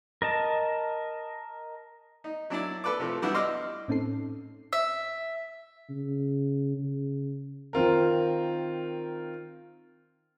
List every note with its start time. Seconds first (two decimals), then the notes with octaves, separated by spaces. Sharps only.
0.22 A#4 D#5 A5
2.24 D#4
2.50 F#3 D4 E4 D5
2.84 A4 B4 D5 D6
2.99 C3 F3 A3
3.22 E3 G3 B3 D4 E4 F#4
3.34 D#5 C6 D6 E6 F6
3.88 A2 C4 C#4 D#4 A4 C7
4.73 E5
5.89 C#3
6.78 C#3
7.73 D#3 C4 F4 A#4